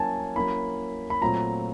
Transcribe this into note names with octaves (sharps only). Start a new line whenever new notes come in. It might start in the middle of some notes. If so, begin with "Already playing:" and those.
Already playing: F#3 A#3 C#4 E4 G#5 A5
F#3 A#3 C#4 E4 B5
B5
A#2 F#3 A3 C4 F4 A#5